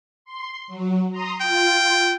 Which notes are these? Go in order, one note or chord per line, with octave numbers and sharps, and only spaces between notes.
C6
F#3
A#5 C6 D#6
F4 G5